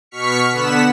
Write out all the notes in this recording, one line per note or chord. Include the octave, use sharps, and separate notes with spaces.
B2 C#6 F6 B6 C#7
D3 B3 F#5 B6 E7